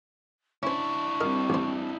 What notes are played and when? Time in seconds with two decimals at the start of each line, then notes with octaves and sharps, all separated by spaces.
0.63 C#4 D4 E4 C5 C#6
1.21 G3 C4 A#4 D#5
1.50 A1 C5